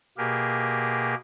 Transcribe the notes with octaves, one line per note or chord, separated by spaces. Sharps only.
B2 A#3 G4 G#4 A#4